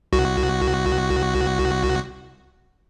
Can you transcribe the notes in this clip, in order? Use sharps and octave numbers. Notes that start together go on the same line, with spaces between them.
C2 F#4